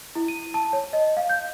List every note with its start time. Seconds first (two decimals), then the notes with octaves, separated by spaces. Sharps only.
0.15 E4
0.28 D#7
0.54 A5
0.73 C#5
0.93 D#5
1.17 F5
1.29 G6